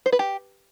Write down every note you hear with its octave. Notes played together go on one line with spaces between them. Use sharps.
C5
B4
G4